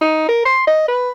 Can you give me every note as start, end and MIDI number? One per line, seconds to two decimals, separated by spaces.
0.01 0.26 63
0.29 0.42 70
0.45 0.63 84
0.67 0.88 75
0.88 1.10 71